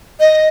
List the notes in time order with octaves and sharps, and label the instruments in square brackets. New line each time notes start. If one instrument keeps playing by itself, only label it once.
[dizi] D#5